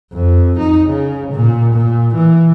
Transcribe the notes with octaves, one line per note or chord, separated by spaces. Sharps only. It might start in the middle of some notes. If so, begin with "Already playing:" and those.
F2
D#4
C#3
A#2
A#2
E3